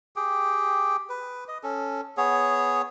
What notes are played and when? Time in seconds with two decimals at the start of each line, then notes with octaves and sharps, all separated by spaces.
0.16 G4 G#4 G5
1.09 B4
1.48 D#5
1.63 C#4 A4
2.17 B3 G#4 C#5